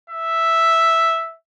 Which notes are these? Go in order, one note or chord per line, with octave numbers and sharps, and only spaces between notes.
E5